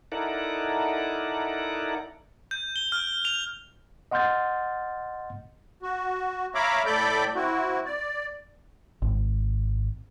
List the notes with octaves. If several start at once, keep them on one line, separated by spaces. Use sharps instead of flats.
D#4 E4 A4 A#4 D5 F#5
G6
G7
F6
F7
D#5 F#5 C6 F6 G6 A6
F#4
C#5 E5 F5 A#5 B5 D6
A2 A4 D5 B5 D6 G6
C4 E4 F#4
D5
G#1